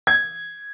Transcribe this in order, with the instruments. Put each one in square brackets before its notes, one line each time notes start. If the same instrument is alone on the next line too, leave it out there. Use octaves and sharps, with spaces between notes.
[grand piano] G#6